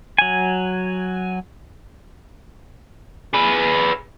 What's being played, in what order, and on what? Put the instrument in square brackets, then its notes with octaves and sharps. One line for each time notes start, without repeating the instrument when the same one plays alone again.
[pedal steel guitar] F#3 G#5
[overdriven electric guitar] G#4 B4